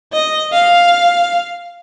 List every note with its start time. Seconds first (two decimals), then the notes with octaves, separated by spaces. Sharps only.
0.13 D#5
0.52 F5